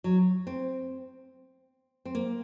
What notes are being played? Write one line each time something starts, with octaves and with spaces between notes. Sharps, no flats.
F#3
C4
C4
A#3